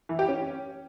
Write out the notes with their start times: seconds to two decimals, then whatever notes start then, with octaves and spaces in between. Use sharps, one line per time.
0.09 E3
0.19 G4
0.29 C#4